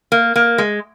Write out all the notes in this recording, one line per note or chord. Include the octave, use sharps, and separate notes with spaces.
A#3
A#3
G#3